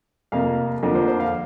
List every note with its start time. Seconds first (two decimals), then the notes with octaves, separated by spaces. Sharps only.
0.32 F2 C3 A#3 F5
0.83 F2 D3 F3 A#3
0.95 C5
1.08 C5
1.20 F5